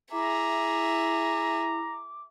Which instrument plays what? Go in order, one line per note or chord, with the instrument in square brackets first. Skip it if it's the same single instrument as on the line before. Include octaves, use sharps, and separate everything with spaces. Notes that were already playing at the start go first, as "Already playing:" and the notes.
[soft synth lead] E4 [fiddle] G#4 E5 [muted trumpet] A#5 [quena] D6